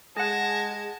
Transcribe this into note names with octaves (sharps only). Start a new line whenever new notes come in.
G#3 G#4 F#5 A5 G#6 A#6